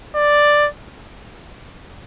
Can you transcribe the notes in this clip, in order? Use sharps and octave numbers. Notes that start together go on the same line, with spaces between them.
D5